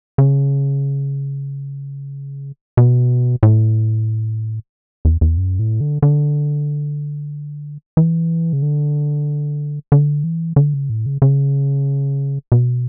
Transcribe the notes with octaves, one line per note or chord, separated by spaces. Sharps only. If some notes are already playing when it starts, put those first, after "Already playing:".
C#3
B2
A2
E2
E2
F#2
A2
D3
D3
E3
C#3
D3
D3
E3
D3
C#3
A2
C#3
C#3
B2